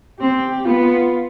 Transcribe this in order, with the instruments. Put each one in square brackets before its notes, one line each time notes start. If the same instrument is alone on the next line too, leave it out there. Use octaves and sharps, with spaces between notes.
[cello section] C4 [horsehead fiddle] G4
[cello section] B3 [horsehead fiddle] F4